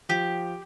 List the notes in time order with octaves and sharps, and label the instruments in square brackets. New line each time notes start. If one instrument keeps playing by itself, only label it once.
[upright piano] F3 [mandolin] G4